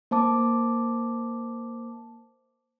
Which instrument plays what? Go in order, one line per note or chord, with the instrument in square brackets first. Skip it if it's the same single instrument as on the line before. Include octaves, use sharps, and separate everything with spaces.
[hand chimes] A#3 C5 A5 D6